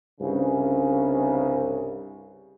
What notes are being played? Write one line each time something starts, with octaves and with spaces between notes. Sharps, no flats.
C2 G2 C#3